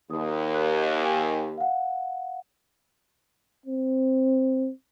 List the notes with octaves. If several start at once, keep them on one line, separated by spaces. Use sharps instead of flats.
D#2 D#6
F#6
G5 G#5
F5 F#5
C4